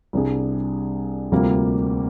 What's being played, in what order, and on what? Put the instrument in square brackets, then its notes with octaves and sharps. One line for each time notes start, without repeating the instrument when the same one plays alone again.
[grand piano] C2 C3 G3 D4 G#4
D2 C3 G3 A#3 F4